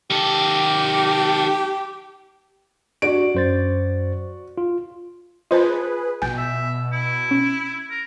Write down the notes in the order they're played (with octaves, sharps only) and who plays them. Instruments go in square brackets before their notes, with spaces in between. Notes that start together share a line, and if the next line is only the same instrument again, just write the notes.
[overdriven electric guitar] D#3 A4 [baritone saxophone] G4
[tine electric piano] D4 [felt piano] F#4 D5 D7
[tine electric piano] F#2 C5 A6
F4
[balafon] F4 C5 [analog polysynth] G#4 B4 [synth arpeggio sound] D#5 A5
[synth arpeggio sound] A#1 [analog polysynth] B2 [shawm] G5 [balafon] G#5
[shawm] E5
E4
[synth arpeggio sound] C#4
[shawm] A#4